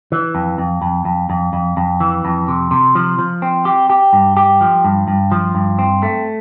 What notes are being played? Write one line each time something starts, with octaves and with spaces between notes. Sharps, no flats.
E3
F2
F2
F2
F2
F2
F2
F2
E3
F2
C3
C3
F3
F3
C4
G4
G4
G2
G4
F3
G2
G2
F3
G2
C4
A3